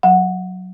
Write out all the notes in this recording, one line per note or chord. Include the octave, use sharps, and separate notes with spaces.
F#3 F#5